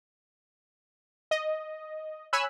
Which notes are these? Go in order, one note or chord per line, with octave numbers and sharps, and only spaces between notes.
D#5
C#5 G#5 B5 E6 F#6